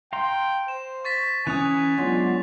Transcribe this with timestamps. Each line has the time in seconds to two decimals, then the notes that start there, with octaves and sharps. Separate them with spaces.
0.13 F5 G5 A#5 C6
0.68 C5 E7
1.05 C#6 A6 B6
1.47 E3 C#4 G#5 D#6 F#6 F7
1.98 F#3 G#3 B3 D4 F4